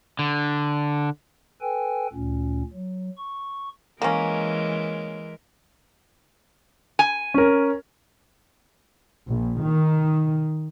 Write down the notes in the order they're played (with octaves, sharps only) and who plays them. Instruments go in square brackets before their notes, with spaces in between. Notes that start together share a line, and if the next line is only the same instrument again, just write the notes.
[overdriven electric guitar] D3
[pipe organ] A4 B4 G5 G#5
D2 A#2 C#4
F#3
C#6
[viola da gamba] E3 G#3 A#4 [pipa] A#3 C#4
[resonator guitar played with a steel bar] G#5
[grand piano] C#4 A#4
[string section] A#1
D#3